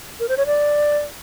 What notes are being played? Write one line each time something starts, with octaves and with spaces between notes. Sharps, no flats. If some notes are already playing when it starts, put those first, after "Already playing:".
A#4
C5
C#5
D5